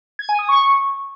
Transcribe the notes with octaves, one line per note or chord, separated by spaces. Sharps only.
G#6
G#5
D#6
C#6